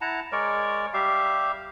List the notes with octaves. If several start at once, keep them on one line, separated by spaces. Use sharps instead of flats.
E4 F#5 A5 A#5
G#3 A#4 C#5 D5
G3 G4 E5 F5